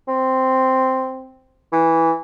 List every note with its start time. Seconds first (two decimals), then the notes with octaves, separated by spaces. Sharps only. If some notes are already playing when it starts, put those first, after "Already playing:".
0.08 C4
1.73 E3